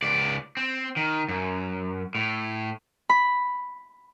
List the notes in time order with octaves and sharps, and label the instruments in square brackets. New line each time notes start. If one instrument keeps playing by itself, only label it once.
[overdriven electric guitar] C#2 D5
C4
D#3
F#2
A2
[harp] B5